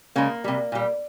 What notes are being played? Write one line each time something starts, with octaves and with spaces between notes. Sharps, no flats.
C#3 G#3 A#3
C3 G3
A#2 G3